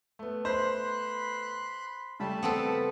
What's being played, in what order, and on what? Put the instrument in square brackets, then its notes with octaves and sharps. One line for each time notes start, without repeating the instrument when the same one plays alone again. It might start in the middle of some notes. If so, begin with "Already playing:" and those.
[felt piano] A3 B3
[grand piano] C5 [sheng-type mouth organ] B5 C6 F#6
[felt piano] C#3 G3 A3 [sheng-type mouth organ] A5 B5
[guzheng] B3 C4 A4